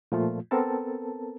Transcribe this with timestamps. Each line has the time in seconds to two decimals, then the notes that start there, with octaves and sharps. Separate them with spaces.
0.12 A#2 F3 A3 F4
0.51 B3 C4 A4 A#4 A5